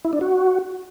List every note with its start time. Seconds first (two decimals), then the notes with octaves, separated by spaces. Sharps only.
0.05 E4
0.13 D4
0.21 F#4